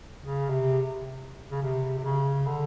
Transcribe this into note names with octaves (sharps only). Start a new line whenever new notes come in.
C#3
C3
C#3
C3
C3
C#3
D3